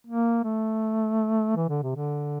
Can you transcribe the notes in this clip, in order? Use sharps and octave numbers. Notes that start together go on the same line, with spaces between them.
A#3
A3
E3
D3
C3
D3